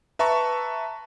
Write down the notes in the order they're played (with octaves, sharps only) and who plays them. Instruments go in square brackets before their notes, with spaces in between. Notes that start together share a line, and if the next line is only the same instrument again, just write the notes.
[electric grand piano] B4 E5 A5 A#5 C#6